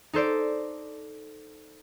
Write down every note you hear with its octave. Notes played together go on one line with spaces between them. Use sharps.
D#4 A4 C5 D5